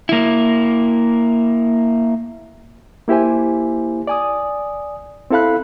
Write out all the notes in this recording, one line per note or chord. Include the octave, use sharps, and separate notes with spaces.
A#3 E4
A#3 E4 G4 C5 G#5
D5 G#5 D#6
C4 E4 A4 F5 B5 F#6